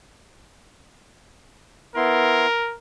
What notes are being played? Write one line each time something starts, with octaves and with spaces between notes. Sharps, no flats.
B3 E4 A#4 C6